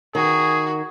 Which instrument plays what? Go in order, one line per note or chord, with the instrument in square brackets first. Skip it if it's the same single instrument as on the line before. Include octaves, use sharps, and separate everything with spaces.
[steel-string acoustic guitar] D#3 [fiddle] F#4 [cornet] G#4